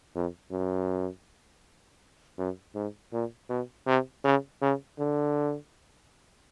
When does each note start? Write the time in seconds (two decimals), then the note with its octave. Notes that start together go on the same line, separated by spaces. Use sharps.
0.15 F2
0.51 F#2
2.38 F#2
2.75 G#2
3.13 A#2
3.49 B2
3.87 C3
4.24 C#3
4.62 C#3
4.99 D3